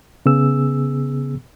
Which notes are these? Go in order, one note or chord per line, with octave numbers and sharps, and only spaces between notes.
C#3 B3 G#4 E6